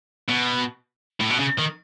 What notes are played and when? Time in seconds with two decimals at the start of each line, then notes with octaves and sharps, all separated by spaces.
0.29 B2
1.21 A2
1.30 B2
1.40 C#3
1.59 D#3